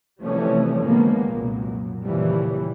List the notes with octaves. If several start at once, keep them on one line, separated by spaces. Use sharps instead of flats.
C3 E3 F3 G3 A3 C#4
D#2 D3 F3 G#3 A#3 B3
C2 F#2 A#2
D#2 A#2 C#3 E3 F3 G3